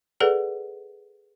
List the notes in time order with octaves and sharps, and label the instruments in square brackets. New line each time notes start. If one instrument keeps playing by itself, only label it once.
[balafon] G#4 A4 B4 D5 F#5